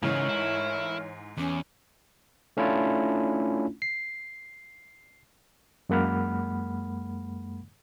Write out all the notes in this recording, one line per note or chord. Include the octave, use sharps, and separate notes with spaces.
G#2 C#3 E3 A3 A#4 C#5
E4
E2 C#4 G4
A3 C#4 D4 E4 F4
C7
F#2 G#3 A#3 F#5 B5 F6